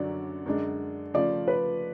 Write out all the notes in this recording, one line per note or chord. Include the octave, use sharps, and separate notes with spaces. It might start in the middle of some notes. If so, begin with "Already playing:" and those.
Already playing: F#2 D3 F#3 C#4 D5
F#2 D3 G#3 D4
C#3 F3 A3 F4 D5
B4